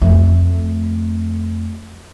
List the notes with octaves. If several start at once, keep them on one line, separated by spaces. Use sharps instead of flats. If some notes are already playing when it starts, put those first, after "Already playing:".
F2 A3